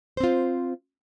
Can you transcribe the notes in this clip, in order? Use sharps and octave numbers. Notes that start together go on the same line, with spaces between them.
C4 F4 C5